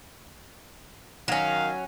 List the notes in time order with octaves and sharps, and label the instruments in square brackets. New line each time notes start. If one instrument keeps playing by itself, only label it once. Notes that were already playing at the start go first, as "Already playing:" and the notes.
[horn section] D#3 F5 [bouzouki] F#3 C#4